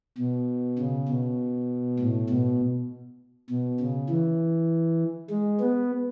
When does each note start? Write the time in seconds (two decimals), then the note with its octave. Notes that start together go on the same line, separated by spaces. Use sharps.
0.18 B2
0.79 C#3
1.09 B2
2.00 A2
2.30 B2
3.50 B2
3.80 C#3
4.09 E3
5.30 G#3
5.60 B3